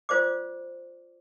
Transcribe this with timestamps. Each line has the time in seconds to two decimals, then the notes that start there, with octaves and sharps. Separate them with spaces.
0.09 F4 C5 D5 D6